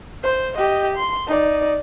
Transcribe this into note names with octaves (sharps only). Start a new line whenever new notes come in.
C5
G4 D#5
C6
D#4 D5